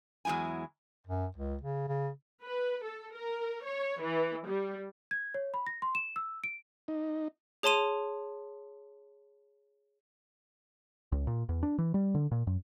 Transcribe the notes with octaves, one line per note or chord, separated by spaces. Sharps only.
E2 F#3 G#3 E4 G#5
F#2
C#2
C#3
C#3
B4
A4
A#4
C#5
E3
G3
G#6
C#5
B5
A#6
C6
E7
E6
D7
D#4
G#4 C#5 A5 C6 D#7 F7
C#2
A#2
E2
D4
E3
G3
D3
A#2
F#2